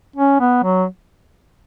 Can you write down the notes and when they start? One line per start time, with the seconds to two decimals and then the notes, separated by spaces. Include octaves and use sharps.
0.16 C#4
0.40 B3
0.63 F#3